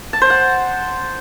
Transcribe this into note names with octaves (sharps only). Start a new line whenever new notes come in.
A5
C5
F#5